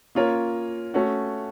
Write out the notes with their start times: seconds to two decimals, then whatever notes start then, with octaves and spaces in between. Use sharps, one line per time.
0.15 A#3 C#4 F4 A#4 C#5
0.94 A3 C#4 F#4